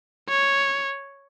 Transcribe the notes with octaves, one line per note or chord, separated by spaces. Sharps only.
C#5